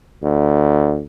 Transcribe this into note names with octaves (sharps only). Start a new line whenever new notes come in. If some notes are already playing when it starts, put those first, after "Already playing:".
D2